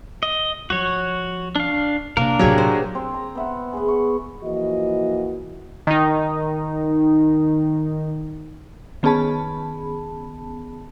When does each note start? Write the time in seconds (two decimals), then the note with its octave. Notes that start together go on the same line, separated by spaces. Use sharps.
0.23 D#5
0.70 F3 F#4 C#5
1.56 D4 F5
2.17 C3 A#3 D4 A#4
2.39 A1 C3 F#3 G4 G#4 C#5
2.58 C5
2.95 C4
3.14 A#5
3.35 B3 E5 F#5
3.73 B3 G#4
3.88 C#6
4.43 E3 F3 A#3 F#4 D#5
5.87 D#3 D#4
9.03 D#3 B3 C#4 G#4 A5 B5